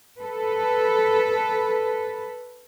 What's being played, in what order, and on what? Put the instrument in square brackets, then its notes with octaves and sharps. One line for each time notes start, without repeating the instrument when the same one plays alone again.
[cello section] A4 B4